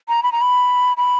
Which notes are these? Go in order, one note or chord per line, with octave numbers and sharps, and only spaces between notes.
A#5
B5
A#5
B5
B5